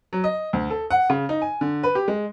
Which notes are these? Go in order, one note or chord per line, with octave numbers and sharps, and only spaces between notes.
F#3
D#5
D2
A4
F#5
C#3
D#4
G#5
D3
B4
G4
G#3